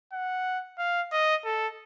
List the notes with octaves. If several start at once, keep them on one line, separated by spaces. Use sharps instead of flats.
F#5
F5
D#5
A4